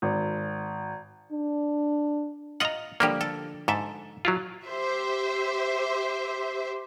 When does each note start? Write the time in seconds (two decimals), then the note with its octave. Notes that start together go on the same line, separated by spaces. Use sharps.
0.02 G#1
1.32 D4
2.60 F4 D#5 F#5 A#5
3.00 D3 F3 G3 A#3 G4
3.21 A4
3.68 G#2 A4 E5
4.25 F#3 E4 F4
4.66 G4 C5 E5